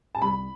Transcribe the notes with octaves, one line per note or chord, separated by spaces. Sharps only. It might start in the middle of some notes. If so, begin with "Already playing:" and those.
A5
C2 B5